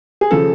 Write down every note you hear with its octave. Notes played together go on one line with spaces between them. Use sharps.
G#4
C#3 F3 A4